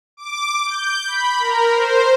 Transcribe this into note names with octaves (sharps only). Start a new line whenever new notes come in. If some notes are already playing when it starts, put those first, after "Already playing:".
D6
G6
B5
A#4
C5